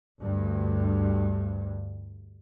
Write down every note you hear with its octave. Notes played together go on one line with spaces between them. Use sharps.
D2 G2